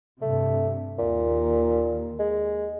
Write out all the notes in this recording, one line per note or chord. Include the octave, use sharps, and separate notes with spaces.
G2 C3 A3
D#2 A#2
G#3